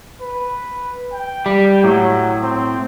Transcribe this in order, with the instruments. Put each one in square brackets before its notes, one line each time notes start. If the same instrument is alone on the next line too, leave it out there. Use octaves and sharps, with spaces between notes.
[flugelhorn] B4
G5
[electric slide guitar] G3
[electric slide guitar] A2 [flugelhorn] F#3
[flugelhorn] C4